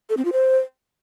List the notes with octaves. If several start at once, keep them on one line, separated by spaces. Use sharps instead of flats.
A4
C4
F4
C5